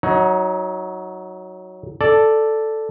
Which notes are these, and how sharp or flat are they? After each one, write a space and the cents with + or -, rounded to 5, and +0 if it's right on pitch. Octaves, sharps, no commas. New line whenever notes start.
F#3 +0 D#4 +25
A4 +0 D5 +0